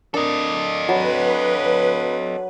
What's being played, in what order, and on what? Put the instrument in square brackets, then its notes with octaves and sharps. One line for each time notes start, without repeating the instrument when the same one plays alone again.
[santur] D4 A#4 [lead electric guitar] A4 D#5
[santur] F#3 A5 B5 [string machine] B4